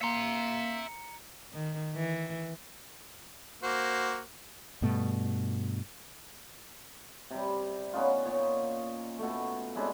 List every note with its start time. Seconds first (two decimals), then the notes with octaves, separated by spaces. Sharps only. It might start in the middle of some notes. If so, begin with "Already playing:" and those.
0.02 A#3 E5 A#5 C6 C#7
1.52 D#3
1.95 E3
3.63 A#3 F#4 C5
4.82 G2 B2 A3
7.31 C3 G3
7.93 B3 C#4 D#4 F4
8.26 A#2 C#5
9.19 B2 A3
9.75 C3 G#3 D4 E4